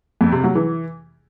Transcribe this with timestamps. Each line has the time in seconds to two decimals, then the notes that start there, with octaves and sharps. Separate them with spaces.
0.21 F2
0.32 C3
0.44 F#3
0.55 E3